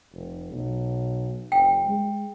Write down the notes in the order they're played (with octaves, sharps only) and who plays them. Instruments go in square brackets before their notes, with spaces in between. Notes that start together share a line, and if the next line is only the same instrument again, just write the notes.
[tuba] F1
B1
[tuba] F#1 [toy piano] G5
[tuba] G#3